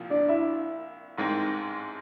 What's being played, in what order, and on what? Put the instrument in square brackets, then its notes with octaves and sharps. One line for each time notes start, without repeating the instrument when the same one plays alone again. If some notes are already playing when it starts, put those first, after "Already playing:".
Already playing: [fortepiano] C2 A#2 F3
[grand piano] D4 D5
E4 E5
[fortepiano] A1 G#2 D#3 G#3 C4